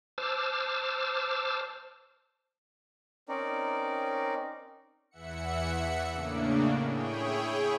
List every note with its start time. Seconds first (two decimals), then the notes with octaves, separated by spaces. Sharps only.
0.18 C5 A5 D6 E6 F6
3.29 C4 C#4 D#4 A#4 D5
5.11 E2 E3 E5 F#5 C#7
6.11 A2 C#3 A#3 D4
6.84 E4 G#4 C#5 G5